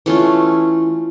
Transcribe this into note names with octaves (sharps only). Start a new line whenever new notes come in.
E3 A3 C#4 F4